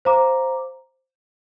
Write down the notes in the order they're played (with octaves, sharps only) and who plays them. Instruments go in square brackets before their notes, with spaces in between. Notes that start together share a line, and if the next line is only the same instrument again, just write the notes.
[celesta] C5 F5 A#5 D6